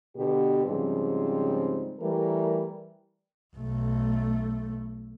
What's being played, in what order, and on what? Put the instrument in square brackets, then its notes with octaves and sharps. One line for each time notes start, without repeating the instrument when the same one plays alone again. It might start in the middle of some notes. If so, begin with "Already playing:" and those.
[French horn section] B2 D3 G4
G#2 C#3 F3 G3 C4
E3 G3 A3 A#4
[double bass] B1 A3